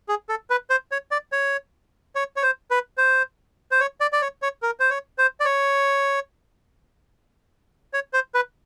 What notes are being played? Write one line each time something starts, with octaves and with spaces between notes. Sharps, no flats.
G#4
A4
B4
C5
C#5
D5
C#5
C#5
C#5
C5
B4
C5
C5
C#5
D5
D5
C#5
C#5
A#4
C5
C#5
C5
D5
C#5
C#5
C5
B4